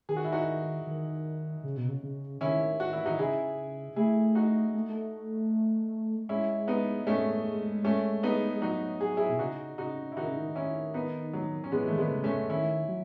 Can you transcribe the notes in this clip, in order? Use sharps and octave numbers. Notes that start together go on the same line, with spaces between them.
D#3 G#4
F#4
E4
D#4 F#4
D#3
C#3
B2
C#3
C#3
D#3 C#4 E4
F#4
E4
E3
D#3 D#4 F#4
C#3 E4 G#4
A3 E4 G#4
D#4 F#4
A3
A3
G#3 C#4 E4
B3 D#4
G#3 A3 C#4
A3 C#4
B3 D#4
G#3
F#3 D#4 F#4
F#3 G#4
E4 G#4
B2
C#3 D#4 F#4
C#3 D#4 F#4
E4
D#3 D#4 F#4
C#3
D#3
C#4 E4
B3 D#4
F#3
C#4
E3 G#3 B3
D#3 A3
G#3 B3
C#3
A3 C#4
D#3 C#4 E4
F#3